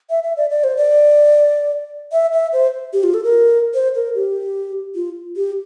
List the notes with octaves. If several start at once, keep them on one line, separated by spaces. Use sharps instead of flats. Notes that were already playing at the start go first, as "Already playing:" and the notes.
E5
E5
D5
D5
C5
D5
E5
E5
C5
G4
F4
A4
A#4
C5
A#4
G4
F4
G4